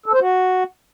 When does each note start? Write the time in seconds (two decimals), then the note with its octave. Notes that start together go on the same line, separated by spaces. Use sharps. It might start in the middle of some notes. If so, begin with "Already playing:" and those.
0.06 A4
0.13 C5
0.20 F#4